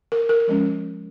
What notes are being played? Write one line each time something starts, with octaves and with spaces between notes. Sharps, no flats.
A#4
A#4
F3 G#3 C#4